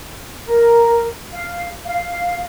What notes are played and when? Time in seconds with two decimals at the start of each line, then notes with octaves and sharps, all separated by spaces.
0.45 A#4
1.32 F5
1.86 F5